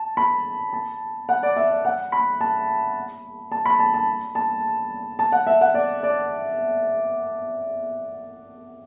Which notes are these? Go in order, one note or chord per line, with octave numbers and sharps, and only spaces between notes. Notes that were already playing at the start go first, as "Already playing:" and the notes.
Already playing: A5
B5
A5
F#5
D5
E5
D5
F#5
B5
A5
A5
B5
A5
A5
A5
A5
F#5
E5
F#5
D5
D5